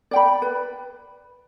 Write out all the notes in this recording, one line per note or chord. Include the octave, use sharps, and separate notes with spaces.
D5 G5 B5
B4